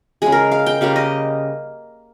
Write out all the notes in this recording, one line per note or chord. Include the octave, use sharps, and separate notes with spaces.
C#3 G#3 G#4
A#4
F5
G5
C#3 G3 A#3 F5
D#5